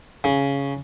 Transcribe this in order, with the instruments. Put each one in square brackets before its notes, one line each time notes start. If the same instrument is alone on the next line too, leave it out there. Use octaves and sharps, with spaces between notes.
[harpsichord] C#3